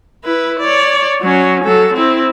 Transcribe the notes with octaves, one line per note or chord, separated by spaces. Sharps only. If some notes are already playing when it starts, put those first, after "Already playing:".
E4 B4
C#5 D5
F#3 C#4
F#3 A4
C4 E4